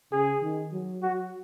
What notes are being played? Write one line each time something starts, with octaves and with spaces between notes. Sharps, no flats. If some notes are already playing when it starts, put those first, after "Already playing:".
C#3 G#4
D#3
F#3
F#3 F#4